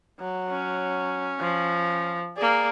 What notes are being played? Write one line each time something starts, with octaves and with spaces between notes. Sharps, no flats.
F#3
C#4
F3
A#3 G#4 D5